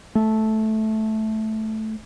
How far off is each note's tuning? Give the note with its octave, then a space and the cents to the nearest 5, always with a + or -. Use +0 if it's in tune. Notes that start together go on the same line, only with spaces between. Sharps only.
A3 -10